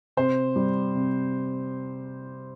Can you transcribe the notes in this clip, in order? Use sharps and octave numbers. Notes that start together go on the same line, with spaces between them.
C3 C5
G3
C3